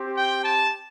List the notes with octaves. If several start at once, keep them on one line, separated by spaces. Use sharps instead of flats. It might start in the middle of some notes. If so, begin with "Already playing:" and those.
Already playing: C4 G4
G5
A5